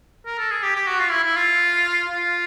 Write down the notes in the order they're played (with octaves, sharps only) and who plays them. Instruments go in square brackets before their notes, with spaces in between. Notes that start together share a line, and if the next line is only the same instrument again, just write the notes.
[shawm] A#4
A4
G#4
G4
G4
F#4
F4
E4
E4
F4
F4